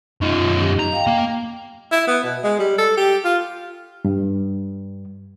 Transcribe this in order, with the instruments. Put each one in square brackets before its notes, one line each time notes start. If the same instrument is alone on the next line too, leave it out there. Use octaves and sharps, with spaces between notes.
[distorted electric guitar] F#2 D#4 [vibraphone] C#4 F4
[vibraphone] G4
[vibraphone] D#5 [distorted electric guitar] A#5
[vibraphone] F5 G5
[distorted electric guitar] A#3
[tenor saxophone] E4
B3
B2
G#3
G3
A4
G4
F4
[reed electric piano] G2